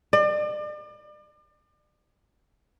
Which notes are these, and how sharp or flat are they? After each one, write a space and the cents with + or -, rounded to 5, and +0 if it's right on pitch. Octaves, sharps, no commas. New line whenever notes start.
D5 +40